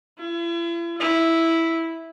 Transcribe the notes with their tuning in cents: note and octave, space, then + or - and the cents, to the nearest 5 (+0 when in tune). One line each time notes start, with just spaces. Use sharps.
E4 +45
E4 -5